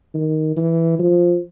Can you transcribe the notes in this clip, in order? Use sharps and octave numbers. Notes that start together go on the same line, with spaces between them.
D#3
E3
F3